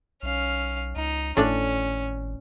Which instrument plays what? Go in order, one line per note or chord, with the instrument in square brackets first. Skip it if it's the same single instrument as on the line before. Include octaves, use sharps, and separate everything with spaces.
[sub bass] B1 [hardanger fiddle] C#4 F5
[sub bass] C#2 [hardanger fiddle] D#4
[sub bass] G#1 [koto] A2 D4 [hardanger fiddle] C#4